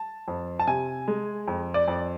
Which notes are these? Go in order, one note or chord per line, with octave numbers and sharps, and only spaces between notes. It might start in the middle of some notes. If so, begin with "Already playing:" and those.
Already playing: A5
F2
A5
C3 G#5
G#3
F2
D5
F2